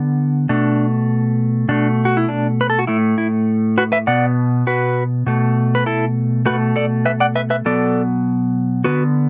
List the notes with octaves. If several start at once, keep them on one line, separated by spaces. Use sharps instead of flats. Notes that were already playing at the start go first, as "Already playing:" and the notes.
Already playing: D3 B3
B2 A3 D4
B2 A3 D4
F#4
E4
D4
B4
A4
F#4
A2 A3 E4
E4
F#4 B4
B4 E5
B2 B3 D5 F#5
F#4 B4
B2 A3
B4
E4 A4
B2 A3 F#4 B4
A4 D5
B4 E5
D5 F#5
B4 E5
B4 E5
B2 F#3 B3 A4 D5
D3 B3 F#4 B4